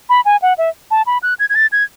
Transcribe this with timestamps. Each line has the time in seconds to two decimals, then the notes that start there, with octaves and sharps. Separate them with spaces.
0.09 B5
0.25 G#5
0.42 F#5
0.58 E5
0.91 A5
1.07 B5
1.23 F#6
1.40 G#6
1.50 G#6
1.55 A6
1.72 G#6